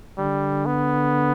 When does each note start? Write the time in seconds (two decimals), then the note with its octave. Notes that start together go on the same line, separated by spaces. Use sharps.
0.18 D3 G3
0.66 B3